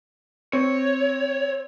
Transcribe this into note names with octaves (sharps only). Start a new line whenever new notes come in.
C4 C#5